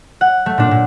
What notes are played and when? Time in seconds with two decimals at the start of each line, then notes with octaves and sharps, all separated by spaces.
0.21 F#5
0.46 A3
0.58 A#2 D4
0.71 A#2